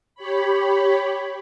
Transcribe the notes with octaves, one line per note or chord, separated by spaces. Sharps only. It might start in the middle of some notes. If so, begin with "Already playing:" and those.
G4 C#5 B5